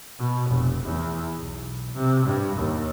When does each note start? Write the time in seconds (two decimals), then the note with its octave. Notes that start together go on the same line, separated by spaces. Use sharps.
0.19 B2
0.50 F1
0.84 E2
1.36 B1
1.93 C3
2.26 G2
2.56 D#2